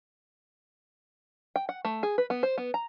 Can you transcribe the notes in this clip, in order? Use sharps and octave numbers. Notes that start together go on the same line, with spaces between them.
G5
F#5
A3
G#4
B4
B3
C5
B3
A#5